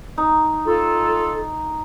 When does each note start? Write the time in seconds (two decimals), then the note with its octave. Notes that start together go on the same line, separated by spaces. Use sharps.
0.18 D#4
0.66 F4 A4